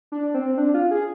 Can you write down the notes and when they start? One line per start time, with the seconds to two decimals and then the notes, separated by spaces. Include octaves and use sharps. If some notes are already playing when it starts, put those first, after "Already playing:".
0.12 D4
0.34 C4
0.57 D4
0.74 F4
0.91 G#4